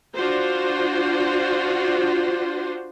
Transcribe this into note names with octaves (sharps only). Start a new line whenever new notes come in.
D4 F4 F#4 C5